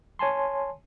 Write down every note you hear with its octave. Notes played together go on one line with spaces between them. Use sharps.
C#5 G#5 A5 C6